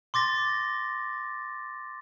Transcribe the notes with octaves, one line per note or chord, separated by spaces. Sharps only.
C6 D6 A6 A#6